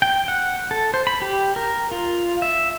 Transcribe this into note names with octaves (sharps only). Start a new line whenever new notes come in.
G5
F#5
A4
C5
B5
G4
A#4
F4
E5